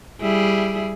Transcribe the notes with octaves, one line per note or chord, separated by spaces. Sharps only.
G3 E4 G#4